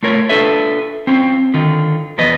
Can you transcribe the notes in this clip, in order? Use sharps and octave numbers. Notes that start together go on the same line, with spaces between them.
A3 F4 A#4 C#5
D4 F4 A4 B4 E5
C4 C#4 F4
D3 D#3 F4
E2 F3 B3 B4 D#5